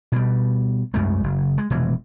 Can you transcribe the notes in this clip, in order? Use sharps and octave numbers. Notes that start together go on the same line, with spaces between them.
B2 G3
C2 F#2 G#3 A3
F#1
G#3
F1 B2 E3 G#3